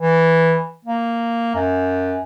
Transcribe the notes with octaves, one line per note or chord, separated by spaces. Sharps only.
E3
A#3
F#2